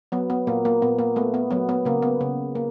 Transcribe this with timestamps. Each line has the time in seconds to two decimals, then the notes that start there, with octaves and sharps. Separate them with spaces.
0.12 F#3 B3
0.30 B3
0.47 A#2 A#3
0.65 A#3
0.82 A#2 B3
0.99 A#3
1.16 A3 B3
1.34 B3
1.50 F#3 B3
1.69 B3
1.85 C#3 A#3
2.02 B3
2.21 C#3
2.55 A#3